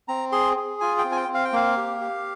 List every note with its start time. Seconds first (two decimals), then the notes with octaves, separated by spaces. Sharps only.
0.08 C4 A#5
0.32 G#4 C6
0.57 G#4
0.81 F4 G#5
0.99 G5
1.04 C4
1.12 G#5
1.17 G5
1.28 C4
1.34 F5
1.45 G5
1.53 A#3 F5
1.77 G4
2.01 G4